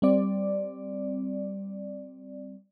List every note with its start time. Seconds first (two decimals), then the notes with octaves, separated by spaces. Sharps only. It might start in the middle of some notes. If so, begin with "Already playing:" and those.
0.02 G3 C4 D5